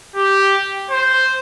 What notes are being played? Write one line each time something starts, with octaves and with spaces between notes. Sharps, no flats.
G4
C5